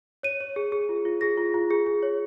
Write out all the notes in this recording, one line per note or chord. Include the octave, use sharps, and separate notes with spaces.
C#5 D#7
C#5
G#4
G#4
F4
F4
G#4 A#6
F4
F4
G#4
G#4
C#5